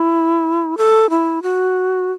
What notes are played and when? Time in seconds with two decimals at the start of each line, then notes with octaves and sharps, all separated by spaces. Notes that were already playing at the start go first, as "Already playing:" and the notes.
Already playing: E4
0.78 A4
1.10 E4
1.43 F#4